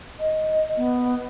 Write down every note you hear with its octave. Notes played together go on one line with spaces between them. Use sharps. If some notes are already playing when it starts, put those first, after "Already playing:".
D#5
B3